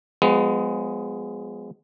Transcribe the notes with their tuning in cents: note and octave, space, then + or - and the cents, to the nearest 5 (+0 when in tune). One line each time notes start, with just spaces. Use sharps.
F3 +45 G#3 +0 B3 +25